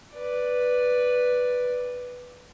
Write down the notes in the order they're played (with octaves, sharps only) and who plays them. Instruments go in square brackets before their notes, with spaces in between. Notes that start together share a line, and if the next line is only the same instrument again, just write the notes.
[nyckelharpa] B4 D5